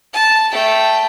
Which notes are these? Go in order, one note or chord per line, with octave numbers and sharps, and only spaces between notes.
A5
A3 G5